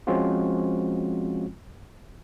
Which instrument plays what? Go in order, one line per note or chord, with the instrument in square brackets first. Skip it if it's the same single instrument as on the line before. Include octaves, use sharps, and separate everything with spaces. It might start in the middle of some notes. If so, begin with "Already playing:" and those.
[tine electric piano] F3 G#3 C4 C#4 F4 F#4